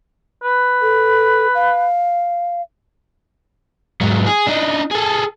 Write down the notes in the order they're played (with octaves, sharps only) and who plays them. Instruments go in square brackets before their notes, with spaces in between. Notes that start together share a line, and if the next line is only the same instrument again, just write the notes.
[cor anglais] B4
[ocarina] A4
F5
[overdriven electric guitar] G#2 F#3
G#4
D4 D#4
G#4 A4